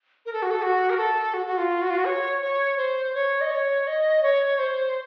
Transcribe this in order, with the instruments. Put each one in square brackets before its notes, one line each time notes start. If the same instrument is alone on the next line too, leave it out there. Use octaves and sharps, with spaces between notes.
[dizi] A#4
A4
F#4
A4
F#4
A#4
A4
F#4
F#4
F4
F#4
F4
F#4
C#5
C#5
C5
C#5
D#5
C#5
D#5
C#5
C5